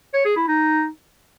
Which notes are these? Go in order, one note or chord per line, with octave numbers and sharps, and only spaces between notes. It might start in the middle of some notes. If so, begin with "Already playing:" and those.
C#5
G#4
E4
D#4